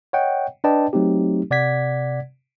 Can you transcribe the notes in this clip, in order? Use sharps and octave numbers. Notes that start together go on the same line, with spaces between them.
C#5 D#5 F#5 G5
D4 B4 D5 D#5 G5 A5
F#3 A3 C4 D#4 G4
C3 D5 F#5 G#6 B6